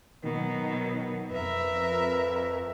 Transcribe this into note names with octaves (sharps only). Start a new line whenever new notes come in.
B2 D#3 F#3 A#4
F2 A#4 B4 E5